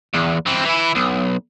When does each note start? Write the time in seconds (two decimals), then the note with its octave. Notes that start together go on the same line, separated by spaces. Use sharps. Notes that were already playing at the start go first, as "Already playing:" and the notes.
0.14 E2
0.47 E3 C4
0.66 E3 E4
0.95 B1